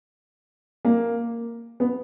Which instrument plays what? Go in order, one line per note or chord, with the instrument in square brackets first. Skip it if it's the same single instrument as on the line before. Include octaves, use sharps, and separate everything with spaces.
[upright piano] A#3
B3